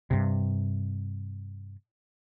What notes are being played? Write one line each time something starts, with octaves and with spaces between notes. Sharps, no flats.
G2 C3